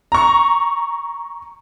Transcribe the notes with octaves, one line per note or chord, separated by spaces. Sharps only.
A#5 C#6